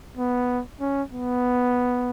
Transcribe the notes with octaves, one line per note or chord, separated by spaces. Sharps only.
B3
C#4
B3